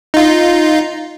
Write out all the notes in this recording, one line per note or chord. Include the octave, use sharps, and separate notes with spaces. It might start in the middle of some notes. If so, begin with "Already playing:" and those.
D#4 F4